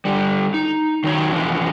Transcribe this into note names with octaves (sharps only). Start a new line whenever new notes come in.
D3 G3
D#4
D#3 F#3 D#4 C#5
E3 F3 G#3 B3 D4